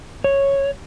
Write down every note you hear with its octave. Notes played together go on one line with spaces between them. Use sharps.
C#5